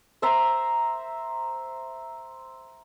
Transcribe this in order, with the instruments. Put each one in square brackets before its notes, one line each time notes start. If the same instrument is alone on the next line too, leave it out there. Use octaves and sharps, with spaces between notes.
[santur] C5 E5 A#5